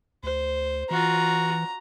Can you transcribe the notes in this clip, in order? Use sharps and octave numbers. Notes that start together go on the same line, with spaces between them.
D2 C5
E3 F4 F#4 A#5